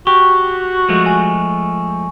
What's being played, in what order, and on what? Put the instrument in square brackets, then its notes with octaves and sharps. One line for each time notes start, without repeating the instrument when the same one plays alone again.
[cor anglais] F#4 [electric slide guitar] G4 [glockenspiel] C#6
[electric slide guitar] F3 G#3 A3
[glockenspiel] G#5